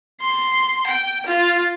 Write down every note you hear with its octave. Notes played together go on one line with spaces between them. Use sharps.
C6
G5
F4